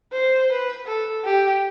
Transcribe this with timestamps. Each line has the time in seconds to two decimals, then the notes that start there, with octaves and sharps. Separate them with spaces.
0.13 C5
0.51 B4
0.87 A4
1.25 G4